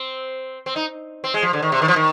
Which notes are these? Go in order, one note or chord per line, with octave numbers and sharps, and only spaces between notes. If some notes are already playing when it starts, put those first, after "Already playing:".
Already playing: C4
C4
D#4
C4
G#3
F3
D3
D#3
C3
D#3
F3
D#3